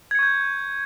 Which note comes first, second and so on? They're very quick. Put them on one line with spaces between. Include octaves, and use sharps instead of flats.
G#6 C#7 C#6 G6